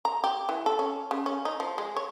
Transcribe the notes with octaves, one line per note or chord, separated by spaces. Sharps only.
A#5
G4
E3
A4
C#4
C#3
C#4
D#4
F3
G#3
C#5